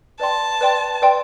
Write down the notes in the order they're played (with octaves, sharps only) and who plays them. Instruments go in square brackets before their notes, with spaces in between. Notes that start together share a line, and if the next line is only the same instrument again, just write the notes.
[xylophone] B4 D5 G5 C6 [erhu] A5
[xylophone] B4 D5 G5 C6
B4 D5 G5 C6